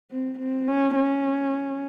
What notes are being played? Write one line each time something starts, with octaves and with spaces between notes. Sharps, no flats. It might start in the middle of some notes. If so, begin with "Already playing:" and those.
C4
C4
C#4
C#4